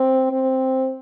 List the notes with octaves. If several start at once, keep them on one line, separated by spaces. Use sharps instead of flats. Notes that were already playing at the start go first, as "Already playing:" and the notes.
Already playing: C4
C4